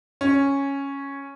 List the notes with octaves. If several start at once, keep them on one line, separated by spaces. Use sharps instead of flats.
C#4